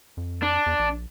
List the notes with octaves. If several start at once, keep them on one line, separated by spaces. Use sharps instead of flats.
F2
D4
E2
A#1